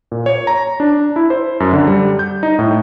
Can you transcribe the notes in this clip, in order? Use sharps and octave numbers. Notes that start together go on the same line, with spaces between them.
A#2
C#5
A#5
D4
E4
C5
F#2
D3
G3
G6
D#4
A2